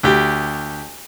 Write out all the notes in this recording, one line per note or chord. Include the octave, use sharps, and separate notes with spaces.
D2 G4